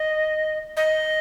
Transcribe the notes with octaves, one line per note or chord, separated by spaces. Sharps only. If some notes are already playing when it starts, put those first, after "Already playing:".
Already playing: D#5
D#5